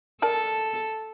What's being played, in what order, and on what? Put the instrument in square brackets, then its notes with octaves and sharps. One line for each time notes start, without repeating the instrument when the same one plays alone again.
[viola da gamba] A4 [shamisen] A#4 D5 A5